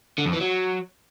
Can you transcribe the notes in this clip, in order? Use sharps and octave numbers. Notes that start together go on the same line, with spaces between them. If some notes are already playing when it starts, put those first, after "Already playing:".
D3
F2
E3
F#3